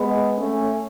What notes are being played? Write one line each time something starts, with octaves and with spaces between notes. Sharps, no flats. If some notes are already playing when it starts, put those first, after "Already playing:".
Already playing: G#3 B3
A3 C#4